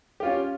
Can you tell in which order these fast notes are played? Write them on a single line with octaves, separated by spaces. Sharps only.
G4 F4 C#4